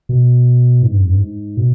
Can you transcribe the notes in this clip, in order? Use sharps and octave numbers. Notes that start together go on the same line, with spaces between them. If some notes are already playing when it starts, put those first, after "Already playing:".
B2
G#2
G2
F2
G2
G#2
B2